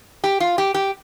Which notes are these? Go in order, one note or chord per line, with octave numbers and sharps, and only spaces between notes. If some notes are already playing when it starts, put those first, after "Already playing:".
G4
F4
G4
G4